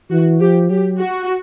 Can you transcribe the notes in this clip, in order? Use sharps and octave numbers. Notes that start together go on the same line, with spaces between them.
E3 F#4
F3 G4
F#3 G4
F#4